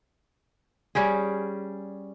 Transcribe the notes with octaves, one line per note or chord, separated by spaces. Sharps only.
G3 C#4 G4 G#4